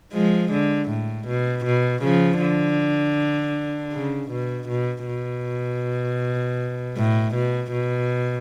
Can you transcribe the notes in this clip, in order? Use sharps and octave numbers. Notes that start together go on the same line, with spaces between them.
F3 G#3
D3
A2
B2
B2
C#3 F3
D3
C#3
B2
B2
B2
A2
B2
B2